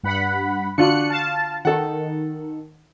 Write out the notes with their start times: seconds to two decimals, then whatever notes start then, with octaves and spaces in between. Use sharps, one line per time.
0.03 G2 F#5 B5
0.78 D3 D4 F4 F#4 F#6 C#7
1.09 F5 A5
1.65 D#3 A4 F#5